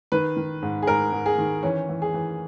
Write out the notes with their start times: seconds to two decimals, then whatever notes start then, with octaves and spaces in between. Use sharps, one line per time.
0.12 D#3 B4
0.37 D#3
0.62 G#2
0.82 G#4
0.87 G#2 A#4
1.12 G#2
1.26 G#4
1.38 D#3
1.63 E3 C#4
1.89 E3
2.02 G#4
2.14 E3